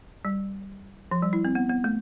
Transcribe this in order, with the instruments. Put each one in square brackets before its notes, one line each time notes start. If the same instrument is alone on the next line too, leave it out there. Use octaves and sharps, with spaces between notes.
[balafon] G3
F3
G3
E4
C4
B3
B3
A3